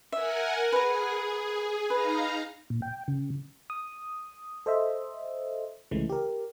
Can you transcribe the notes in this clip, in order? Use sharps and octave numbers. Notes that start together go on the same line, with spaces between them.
A#4 E5 F#5 G#5
G#4 B4 A#5
D#4 B4 F5 A#5
A#2
G5
C#3
D#6
A4 C5 D#5 E5
C2 C#3 E3 G#3 A3
G4 A#4